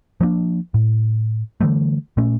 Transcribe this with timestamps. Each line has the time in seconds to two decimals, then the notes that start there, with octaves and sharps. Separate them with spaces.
0.21 F3 A#3 C#4 D4
0.74 A2
1.61 D3 E3 G3 A3
2.17 A#2 A3 C#4